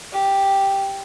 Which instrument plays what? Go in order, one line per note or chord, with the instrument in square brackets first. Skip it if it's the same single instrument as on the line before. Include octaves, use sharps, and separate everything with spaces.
[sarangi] G4